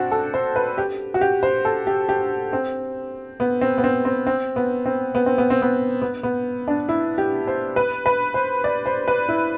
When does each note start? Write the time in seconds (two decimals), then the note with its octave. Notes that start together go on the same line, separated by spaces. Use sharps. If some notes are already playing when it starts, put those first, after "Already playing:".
Already playing: C4 D4 F#4
0.12 A4
0.34 C5
0.56 B4
0.78 G4
1.14 F#4
1.21 G4
1.43 C5
1.65 A4
1.87 G4
2.09 G4
2.53 C4
3.40 B3
3.61 C4
3.78 B3
3.84 C4
4.05 C4
4.27 C4
4.56 B3
4.86 C4
5.15 B3
5.26 C4
5.38 B3
5.50 C4
5.62 B3
6.02 B3
6.23 B3
6.68 D4
6.89 E4
7.18 G4
7.47 C5
7.76 B4
8.06 B4
8.34 C5
8.64 D5
8.86 C5
9.08 B4
9.29 E4